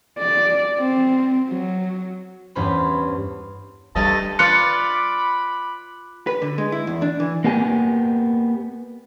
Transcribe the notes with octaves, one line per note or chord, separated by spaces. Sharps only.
D5
C4
F#3
E2 G2 C#4 C5 B5
G2 G3 A3 D#5 A5
F4 B4 D5 B5 D6 F#6 C#7
B4
D3
G#3
E4
E2
D4
E3
A#3 B3 G4 G#5